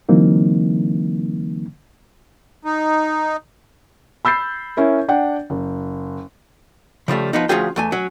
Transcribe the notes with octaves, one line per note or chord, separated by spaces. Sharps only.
D3 E3 F#3 A#3 C4 D#4
D#4
B5 E6 G6 A6 C7
C#4 E4 A#4
D4 F#5 G5
F#1
C#3 F3 G3 A3
F3 B3 D#4
D2 F3 C#4 F4 G#4 G5
E2 A3 G#5
F#3 C#4